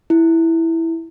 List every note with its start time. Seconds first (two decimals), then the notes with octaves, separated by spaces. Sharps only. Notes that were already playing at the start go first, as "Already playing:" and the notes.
0.10 E4